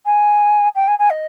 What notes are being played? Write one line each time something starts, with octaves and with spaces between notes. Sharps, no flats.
G#5
G5
G#5
G#5
D#5